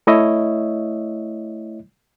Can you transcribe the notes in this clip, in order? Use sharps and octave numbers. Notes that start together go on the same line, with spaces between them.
A3 E4 C#5 D#5 E5